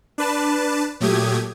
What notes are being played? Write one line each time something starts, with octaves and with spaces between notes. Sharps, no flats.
D4 B4 A5
A#2 F#3 A3 G4 D#6 G#6